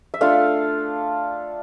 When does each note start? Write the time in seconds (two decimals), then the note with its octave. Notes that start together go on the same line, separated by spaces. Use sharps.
0.14 E5
0.21 A3 D4 F4 F5